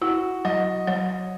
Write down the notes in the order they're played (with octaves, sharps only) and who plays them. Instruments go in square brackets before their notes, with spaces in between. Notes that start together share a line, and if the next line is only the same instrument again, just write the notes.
[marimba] E4 [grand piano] F#4
[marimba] F#3 [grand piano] D#5
[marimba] F#3 [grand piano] C#5